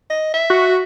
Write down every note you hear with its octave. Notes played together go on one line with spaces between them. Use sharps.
D#5
E5
F#4